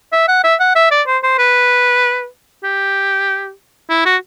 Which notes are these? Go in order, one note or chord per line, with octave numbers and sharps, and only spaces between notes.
E5
F#5
E5
F#5
E5
D5
C5
C5
B4
G4
E4
F#4